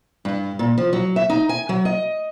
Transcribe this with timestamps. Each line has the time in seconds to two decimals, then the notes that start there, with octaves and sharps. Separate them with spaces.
0.25 G2
0.59 A#2
0.78 F3
0.93 F#3
1.16 E5
1.30 D#4
1.49 G#5
1.69 F#3
1.85 D#5